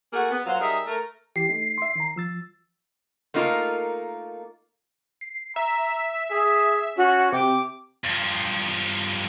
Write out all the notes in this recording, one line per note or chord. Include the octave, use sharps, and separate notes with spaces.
A3 A#3 F#4 G#4 F#5
B3
A#2 F#3 C5 F5 F#5
G3 D#4 G#4 A#4 E5
A3 A#4
E3 G4 C7
A3 D#4
E5 C6
D#3 A#5
F3 E6 A6
A3 A#3 D#4 F4 A#4
C7
E5 A#5
G#4
C#4 F#4
C3 G5 D6
G2 F3